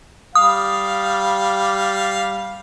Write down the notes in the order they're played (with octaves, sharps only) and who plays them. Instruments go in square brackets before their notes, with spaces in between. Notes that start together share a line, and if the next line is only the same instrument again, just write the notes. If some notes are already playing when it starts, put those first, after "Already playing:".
[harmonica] G3 F5 [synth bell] D#6